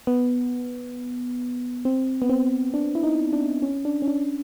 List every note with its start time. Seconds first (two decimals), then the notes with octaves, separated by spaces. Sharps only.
0.07 B3
1.85 C4
2.22 B3
2.29 C4
2.74 D4
2.95 E4
3.04 D#4
3.33 D4
3.62 C#4
3.85 D4
4.02 C#4
4.08 D4